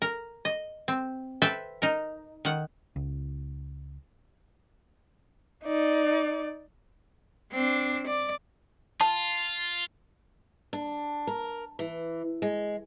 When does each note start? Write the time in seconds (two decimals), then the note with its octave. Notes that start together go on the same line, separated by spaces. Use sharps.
0.02 A#4
0.45 D#5
0.88 C4
1.42 A4 B4 C5 E5 G5
1.82 D#4 A#4
2.45 D#3 F#5
2.96 C#2
5.65 D#4 D5
7.52 C4 D4
8.07 D5
9.01 F4 A5
10.73 D4
11.27 A#4
11.79 E3
12.42 G#3